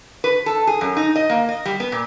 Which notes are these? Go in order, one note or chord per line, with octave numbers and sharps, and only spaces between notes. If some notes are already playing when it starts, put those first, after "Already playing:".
B4
A4
G#4
F#2
D#4
D#5
A#3
D#5
G3
B3
A#2